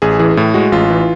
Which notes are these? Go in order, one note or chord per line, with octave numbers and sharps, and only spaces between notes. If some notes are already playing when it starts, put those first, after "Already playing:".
A1 G#4
E3 G#4
A2
G#3 F#4
A1 F4
E3